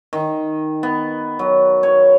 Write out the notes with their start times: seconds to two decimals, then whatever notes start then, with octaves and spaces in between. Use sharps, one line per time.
0.13 D#3
0.83 B3
1.39 F#3
1.83 C#5